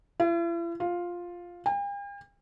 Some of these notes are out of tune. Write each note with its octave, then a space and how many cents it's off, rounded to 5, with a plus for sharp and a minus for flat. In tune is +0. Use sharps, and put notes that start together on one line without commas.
E4 +45
F4 +5
G5 +45